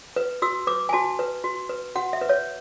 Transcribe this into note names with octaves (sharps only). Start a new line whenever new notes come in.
B4
F#4 E6
B4 D6
G#5
F#4 A5
B4
F#4
B4
F#4 F#5
E5
B4
C#5